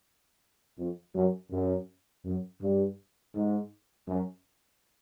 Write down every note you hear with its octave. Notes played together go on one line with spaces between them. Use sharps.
F2
F#2
F#2
F#2
G2
G#2
F#2